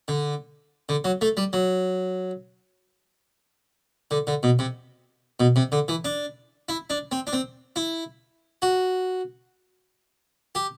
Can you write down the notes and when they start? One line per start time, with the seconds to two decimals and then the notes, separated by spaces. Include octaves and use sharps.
0.08 D3
0.89 D3
1.05 F#3
1.21 A3
1.37 G3
1.53 F#3
4.11 D3
4.27 D3
4.43 B2
4.59 C3
5.40 B2
5.56 C3
5.72 D3
5.88 E3
6.05 D4
6.69 E4
6.90 D4
7.12 C4
7.27 D4
7.33 C4
7.76 E4
8.62 F#4
10.55 G4